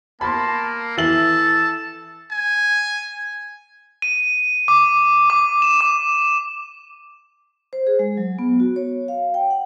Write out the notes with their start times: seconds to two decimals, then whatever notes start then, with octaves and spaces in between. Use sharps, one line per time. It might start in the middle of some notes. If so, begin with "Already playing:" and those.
0.21 A#3 A5 B5 C6
0.97 E3 A4 E5 A5 F#7
2.31 G#5
4.02 D#7
4.68 D6
5.30 D6
5.62 E7
5.81 D6
7.73 C5
7.87 G#4
7.99 G#3
8.17 F#3
8.39 B3
8.60 F#4
8.76 C#5
9.08 F5
9.34 G5
9.51 F#5